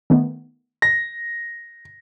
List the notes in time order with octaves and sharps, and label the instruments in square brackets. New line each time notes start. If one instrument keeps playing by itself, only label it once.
[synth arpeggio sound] D#3 A3 B3
[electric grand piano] A#6